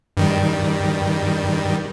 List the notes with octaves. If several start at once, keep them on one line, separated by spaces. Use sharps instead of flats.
G2 D#3 G3